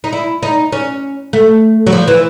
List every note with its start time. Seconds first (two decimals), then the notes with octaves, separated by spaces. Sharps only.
0.04 D#4
0.13 E4
0.43 D#4
0.72 C#4
1.33 A3
1.87 F#3
1.93 F3
2.08 E3